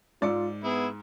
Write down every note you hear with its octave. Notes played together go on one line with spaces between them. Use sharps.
G#2 F4 D5 E6 C#7
B3 E4 G#4